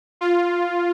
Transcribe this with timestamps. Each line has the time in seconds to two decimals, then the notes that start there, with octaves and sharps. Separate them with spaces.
0.21 F4